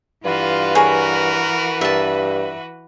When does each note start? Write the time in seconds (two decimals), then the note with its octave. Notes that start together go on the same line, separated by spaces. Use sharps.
0.25 G2 E3 F4 F#4 B4
0.75 G#4 A#4 C#5
1.81 G2 E5 A5